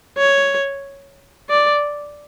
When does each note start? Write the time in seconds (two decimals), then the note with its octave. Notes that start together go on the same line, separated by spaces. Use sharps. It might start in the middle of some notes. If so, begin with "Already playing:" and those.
0.18 C#5
1.50 D5